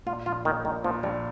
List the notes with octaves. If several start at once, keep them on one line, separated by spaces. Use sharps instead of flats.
A#2 F4
A#1 F4
D#3 A#3
A#1 D#3
A#2 F3
A#1 G3